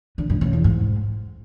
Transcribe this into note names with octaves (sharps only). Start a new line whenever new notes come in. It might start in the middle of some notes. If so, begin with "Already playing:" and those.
D3
G2
C#3
E2
G#2